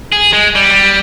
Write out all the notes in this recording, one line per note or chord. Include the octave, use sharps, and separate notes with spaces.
G#4
G#3
G3
G3